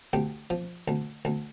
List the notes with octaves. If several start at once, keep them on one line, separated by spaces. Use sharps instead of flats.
D2 G4
F3
D2
D2